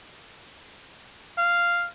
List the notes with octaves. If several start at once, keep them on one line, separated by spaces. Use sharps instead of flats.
F5